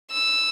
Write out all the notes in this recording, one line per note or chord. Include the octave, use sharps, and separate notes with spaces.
E6